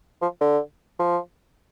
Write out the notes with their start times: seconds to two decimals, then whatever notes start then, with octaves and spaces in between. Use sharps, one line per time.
0.22 F3
0.41 D3
1.00 F3